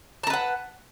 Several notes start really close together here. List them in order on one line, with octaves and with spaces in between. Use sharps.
A5 A#4 B4 F#5